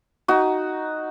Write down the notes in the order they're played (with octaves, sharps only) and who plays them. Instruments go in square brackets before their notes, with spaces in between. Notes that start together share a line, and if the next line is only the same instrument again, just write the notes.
[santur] D#4 F#4